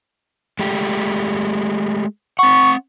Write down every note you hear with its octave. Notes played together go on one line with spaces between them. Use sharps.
G#3 A3 G4
C4 F#5 C#6